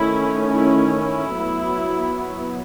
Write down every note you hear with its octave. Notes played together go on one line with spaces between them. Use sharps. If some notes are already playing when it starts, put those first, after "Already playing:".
Already playing: D#3 A3 C#4 E4
E4
E4
F#3 B3